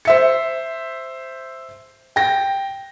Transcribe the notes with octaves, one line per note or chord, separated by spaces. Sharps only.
C5 E5 C#7
G5 A#6